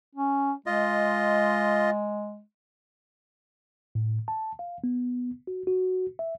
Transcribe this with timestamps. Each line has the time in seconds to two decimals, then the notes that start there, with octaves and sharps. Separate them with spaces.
0.16 C#4
0.66 G#3 F4 D#5
3.95 A2
4.28 A5
4.59 F5
4.84 B3
5.47 F#4
5.67 F#4
6.19 E5